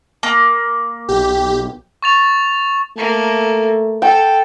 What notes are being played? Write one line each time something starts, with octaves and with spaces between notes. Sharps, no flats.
A#3
B1 G4
C#6 A6 F7
A3 A#3 A4
A4 G5